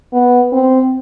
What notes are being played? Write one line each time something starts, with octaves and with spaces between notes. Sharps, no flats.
B3
C4